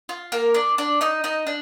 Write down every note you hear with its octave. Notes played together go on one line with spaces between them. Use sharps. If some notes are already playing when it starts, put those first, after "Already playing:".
F4
A#3 A#4
D4 D5
D4 D5
D#4 D#5
D#4 D#5
D4